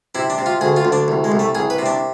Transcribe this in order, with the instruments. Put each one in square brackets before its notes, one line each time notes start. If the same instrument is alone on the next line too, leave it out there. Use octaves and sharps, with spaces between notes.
[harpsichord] C3 E4
D4
C3
F4
D2 G#4
F4
D2
D4
C2
G#3
C2
A3
C2 G#4
B4
C3
D4